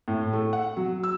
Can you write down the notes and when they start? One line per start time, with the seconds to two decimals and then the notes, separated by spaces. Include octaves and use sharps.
0.08 A2
0.33 A3
0.53 F#5
0.77 F#3
1.04 E6